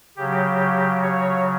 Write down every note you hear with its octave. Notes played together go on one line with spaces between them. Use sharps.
C#3 F#3 G4
C#5